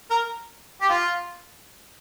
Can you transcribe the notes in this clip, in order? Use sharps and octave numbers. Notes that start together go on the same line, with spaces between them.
A#4
G4
F4